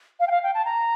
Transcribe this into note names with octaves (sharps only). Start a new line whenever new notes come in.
F5
G5
F5
G5
A5
A#5